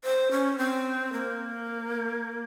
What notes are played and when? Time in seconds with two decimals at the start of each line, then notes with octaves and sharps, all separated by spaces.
0.04 C5
0.31 C#4
0.58 C4
1.12 A#3